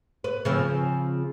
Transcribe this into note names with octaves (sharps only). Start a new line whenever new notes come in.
B4
C#3 F3 C4